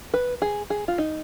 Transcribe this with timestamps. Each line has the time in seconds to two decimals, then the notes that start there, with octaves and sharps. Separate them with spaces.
0.14 B4
0.42 G#4
0.70 G#4
0.88 F4
0.98 D#4